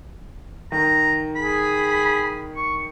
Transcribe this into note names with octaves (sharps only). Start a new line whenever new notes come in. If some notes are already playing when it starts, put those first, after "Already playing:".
D#3 A#5
G#4 B5
C#6